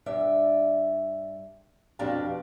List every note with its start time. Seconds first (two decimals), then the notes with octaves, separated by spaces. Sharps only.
0.06 G2 D5 E5
1.99 F2 B2 D4 G4 F5 A5